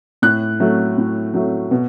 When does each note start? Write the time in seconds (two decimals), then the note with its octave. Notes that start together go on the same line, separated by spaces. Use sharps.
0.22 A2 F#6
0.60 F#3 A3
0.98 A2
1.34 F#3 A3
1.71 B2